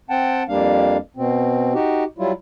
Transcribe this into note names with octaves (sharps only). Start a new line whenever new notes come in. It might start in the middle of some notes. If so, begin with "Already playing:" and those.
C4 F#5 G5 A5
F2 G3 A#3 D4 F5
B2 C4
D#4 F#4 G4
F#3 G3 E4 F4